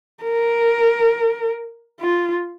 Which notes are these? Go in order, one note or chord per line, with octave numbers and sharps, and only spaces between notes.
A#4
F4